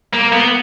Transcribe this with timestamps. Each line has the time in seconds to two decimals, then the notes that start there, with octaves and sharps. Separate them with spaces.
0.13 A#3
0.32 B3